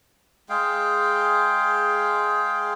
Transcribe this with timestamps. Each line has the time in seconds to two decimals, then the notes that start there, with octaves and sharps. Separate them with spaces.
0.49 G#3 G#4 F5 G5